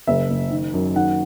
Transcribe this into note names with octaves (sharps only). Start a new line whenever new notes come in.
F#1 E5
F#1
D#3
F#2
D#3 F#5